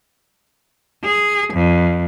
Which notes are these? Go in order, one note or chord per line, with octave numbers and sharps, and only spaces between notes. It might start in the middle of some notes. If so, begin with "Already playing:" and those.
G#4
F2